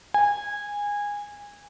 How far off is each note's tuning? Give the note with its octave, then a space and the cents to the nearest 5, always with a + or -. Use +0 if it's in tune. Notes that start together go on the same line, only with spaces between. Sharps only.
G#5 -20